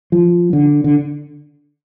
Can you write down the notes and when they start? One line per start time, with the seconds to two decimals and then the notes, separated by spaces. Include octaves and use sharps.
0.12 F3
0.53 D3
0.84 D3